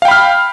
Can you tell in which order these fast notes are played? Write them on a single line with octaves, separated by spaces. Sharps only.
F5 G5 B5 F6